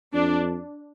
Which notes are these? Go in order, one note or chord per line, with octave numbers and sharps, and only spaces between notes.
F2 D4